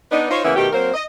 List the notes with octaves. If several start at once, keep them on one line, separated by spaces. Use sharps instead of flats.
B3 D4 D#4
D#4 F4 C5 C#5
C#3 E3 A#3 B3 C#4 E4
B2 D#3 A3 G4
F#3 A#3 C4 A#4 C5
D#5